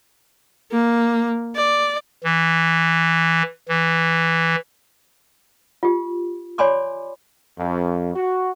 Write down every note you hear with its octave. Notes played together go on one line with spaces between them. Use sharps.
A#3
D5
E3
E3
F4 G4
C#5 D5 G#5 B5 C6 D6
F2
F#4